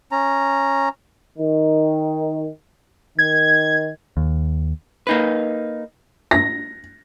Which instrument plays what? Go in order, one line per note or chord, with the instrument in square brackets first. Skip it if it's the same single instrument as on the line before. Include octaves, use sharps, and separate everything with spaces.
[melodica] C#4 A#5
[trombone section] D#3
[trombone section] D#3 [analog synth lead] G#6
[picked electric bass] D#2
[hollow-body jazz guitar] A#3 D#4 B4
[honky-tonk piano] A#6